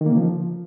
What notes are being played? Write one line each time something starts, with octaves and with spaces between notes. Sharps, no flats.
D#3
A#3
C#3
F3